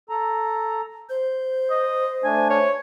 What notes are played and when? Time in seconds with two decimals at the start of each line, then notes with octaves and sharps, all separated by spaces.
0.09 A4 A#5
1.10 C5 G6
1.70 D#5
2.24 A3 D4 G#5
2.50 C#5